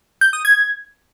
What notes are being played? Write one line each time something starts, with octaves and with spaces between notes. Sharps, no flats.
G6
D#6
G#6